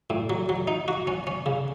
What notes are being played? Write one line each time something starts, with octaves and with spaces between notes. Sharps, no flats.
A2
F#3
F#3
D#4
F#4
C#4
C#4
C#3